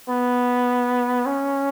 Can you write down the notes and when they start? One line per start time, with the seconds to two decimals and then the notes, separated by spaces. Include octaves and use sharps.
0.08 B3
1.26 C#4